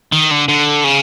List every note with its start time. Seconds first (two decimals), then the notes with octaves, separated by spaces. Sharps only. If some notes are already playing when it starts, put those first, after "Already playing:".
0.12 D#3
0.31 D3
0.48 D3
0.84 C#3